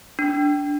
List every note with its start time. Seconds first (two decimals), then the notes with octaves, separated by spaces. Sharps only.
0.19 D4